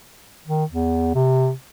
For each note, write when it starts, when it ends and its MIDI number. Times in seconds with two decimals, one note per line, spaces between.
0.47 0.64 51
0.71 1.14 40
1.15 1.51 48